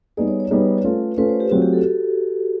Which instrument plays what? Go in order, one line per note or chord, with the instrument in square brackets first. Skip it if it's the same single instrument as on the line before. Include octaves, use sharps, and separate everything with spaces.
[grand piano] G3 B3 D#4 G#4 [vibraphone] D5
[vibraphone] C#5
C#5
[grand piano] G3 B3 D#4 G#4 [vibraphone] B4
[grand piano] A3 C#4 F4 A4
[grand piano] A3 C#4 F4 A4 [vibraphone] B4
[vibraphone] C5
G4
[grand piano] F#3 A3 C4 F4 G#4 [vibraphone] F#4
[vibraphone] G4
A4